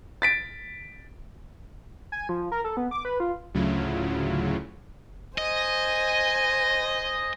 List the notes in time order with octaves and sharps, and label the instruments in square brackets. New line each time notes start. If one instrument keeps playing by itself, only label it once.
[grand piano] A6 B6 D7
[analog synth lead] G#5
F3
A#4
A4
B3
D6
B4
F4
[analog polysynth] D2 A2 C#3 F#3 E4 F4
[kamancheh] C5 G#5 [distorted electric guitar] D#5